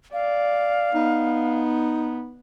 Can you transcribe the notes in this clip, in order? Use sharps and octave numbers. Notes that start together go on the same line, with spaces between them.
D5 F5
B3 D#4